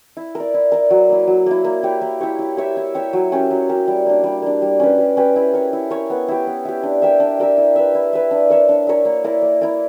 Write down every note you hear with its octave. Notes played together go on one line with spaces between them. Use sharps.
E4
A#4 D5
E4
A#4 D5
F#3
A#3 E4
F#3
A#3 E4
A#3
E4 G4 C#5
A#3
E4 G4 C#5
E4
G4 C#5 E5
E4
G4 C#5 E5
F#3
C#4 G4 A#4
F#3
C#4 G4 A#4
G3
A#3 D4
G3
A#3 D4
G3
C#4 G4 B4
G3
C#4 G4 B4
E4
A#4 C#5
E4
A#4 C#5
B3
E4 G4
B3
E4 G4
D4
G4 A#4 E5
D4
G4 A#4 E5
E4
B4 E5
E4
B4 E5
D4
A#4 C#5 E5
D4
A#4 C#5 E5
A#3
E4 A#4 D5
A#3
E4 A#4 D5